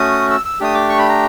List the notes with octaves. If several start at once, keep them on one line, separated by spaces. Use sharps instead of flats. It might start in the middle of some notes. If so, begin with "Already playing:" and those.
Already playing: A3 C#4 F#4 D#6
E6
E6
A3 D4 G4 D#6
D6
C#6
B5
A#5